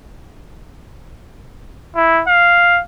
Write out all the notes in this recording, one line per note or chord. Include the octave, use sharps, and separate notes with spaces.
E4
F5